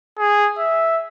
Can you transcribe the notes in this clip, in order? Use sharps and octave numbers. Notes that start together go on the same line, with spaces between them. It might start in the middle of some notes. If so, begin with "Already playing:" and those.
G#4
E5